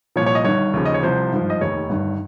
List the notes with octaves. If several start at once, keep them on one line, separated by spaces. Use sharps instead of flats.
C2 A#2 F3 C#5
C#5
D#5
G1 G2 D#3 C#5
D#2 C#3 F3
D#5
C#5
C2 C3 F3 C5
G#1 G2 F3
D#5
F1 D#2 D#3 C#5
G1 G2 D#3